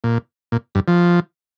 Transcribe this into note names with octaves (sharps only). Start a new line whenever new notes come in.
A#2
A#2
G2
F3